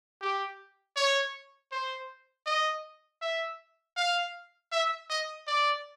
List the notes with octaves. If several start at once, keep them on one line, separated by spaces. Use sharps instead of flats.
G4
C#5
C5
D#5
E5
F5
E5
D#5
D5